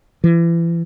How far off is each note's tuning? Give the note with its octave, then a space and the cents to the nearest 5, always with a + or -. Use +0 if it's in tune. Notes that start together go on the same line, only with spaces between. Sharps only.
E3 +35